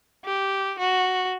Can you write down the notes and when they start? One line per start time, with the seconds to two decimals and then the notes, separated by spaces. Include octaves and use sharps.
0.25 G4
0.79 F#4